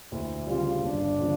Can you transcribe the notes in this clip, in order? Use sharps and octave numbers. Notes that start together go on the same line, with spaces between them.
D2 E4
C#3 G3 F4
G1 D4
C#3 F3 C#4